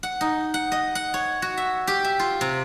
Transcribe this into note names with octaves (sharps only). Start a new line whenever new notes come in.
F#5
D#4
F#5
D#5
F#5
C#5
F#4
E5
G4
E5
F4
C3